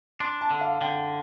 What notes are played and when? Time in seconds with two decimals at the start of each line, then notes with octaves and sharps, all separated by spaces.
0.20 D4 C6
0.41 A5
0.51 D3
0.61 F5
0.81 D3 G5